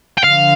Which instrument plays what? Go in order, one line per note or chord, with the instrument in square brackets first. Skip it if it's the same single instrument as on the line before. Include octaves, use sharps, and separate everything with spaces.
[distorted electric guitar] G5
[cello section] D3 F3 [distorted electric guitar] F5